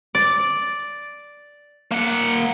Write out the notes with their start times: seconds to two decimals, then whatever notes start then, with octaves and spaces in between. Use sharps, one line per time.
0.15 D5
1.91 A#3 F#5